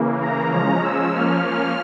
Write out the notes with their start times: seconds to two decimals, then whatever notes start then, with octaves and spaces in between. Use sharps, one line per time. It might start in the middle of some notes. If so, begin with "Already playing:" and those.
Already playing: C#3 E3 A#3
0.21 A#5
0.51 F3 G#3 C#4 A#5
0.82 E6
1.12 F3 A#3 C#4 F6
1.44 F6